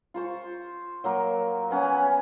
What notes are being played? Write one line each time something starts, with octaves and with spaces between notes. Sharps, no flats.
F4 C5 C#6
F#3 A#3 A#4
B3 C#4 F#5 G#5